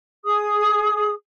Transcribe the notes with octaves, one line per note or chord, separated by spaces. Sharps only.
G#4 D#6